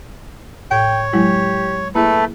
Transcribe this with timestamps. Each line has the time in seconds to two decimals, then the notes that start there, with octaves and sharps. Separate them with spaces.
0.71 A2 C#5 G5
1.13 F#3 G#3 E4 G4
1.95 A3 A#3 E4 G#4 A4 B4